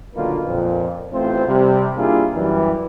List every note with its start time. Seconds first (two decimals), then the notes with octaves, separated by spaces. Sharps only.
0.15 B1 D3 D#3 A#3 F4 B4
0.45 F2 A#2
1.13 A1 A3 C4 F4 C5
1.47 C3 G3
1.96 G3 A#3 D4 E4 F4 G#4
2.34 F#2 E3 G3